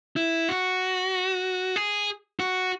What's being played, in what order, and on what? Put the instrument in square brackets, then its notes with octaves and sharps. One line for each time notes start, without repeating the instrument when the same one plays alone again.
[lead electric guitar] E4
F#4
G#4
F#4